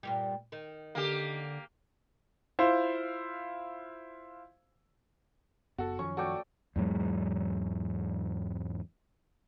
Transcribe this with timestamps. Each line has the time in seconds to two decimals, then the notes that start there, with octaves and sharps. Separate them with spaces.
0.03 G2 A#2 G3
0.52 D#3
0.95 D3 A#3 G4
2.59 E4 F4 C5 F5
5.78 F#1 F#2 B3 F#4 A4
5.99 F#2 D#3 F3 C#4 C#6
6.17 A3 F#4 D5 G5 C#6
6.76 E2 G#2 F#3 G#3